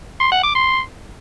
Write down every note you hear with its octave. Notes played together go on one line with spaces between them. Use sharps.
C6
F#5
D6
C6